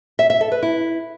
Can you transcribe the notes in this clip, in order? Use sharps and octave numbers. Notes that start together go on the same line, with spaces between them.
E5
E5
A4
B4
E4